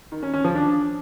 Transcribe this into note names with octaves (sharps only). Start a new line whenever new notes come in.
D#3
C#4
C#4
F3
D4